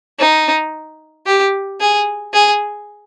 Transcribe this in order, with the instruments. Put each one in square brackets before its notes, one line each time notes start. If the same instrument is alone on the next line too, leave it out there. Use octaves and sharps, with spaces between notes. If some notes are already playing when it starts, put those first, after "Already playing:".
[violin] D#4
G4
G#4
G#4